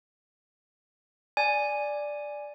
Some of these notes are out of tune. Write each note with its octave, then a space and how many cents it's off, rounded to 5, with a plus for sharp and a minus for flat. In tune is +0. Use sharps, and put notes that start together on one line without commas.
D5 +0 G#5 +0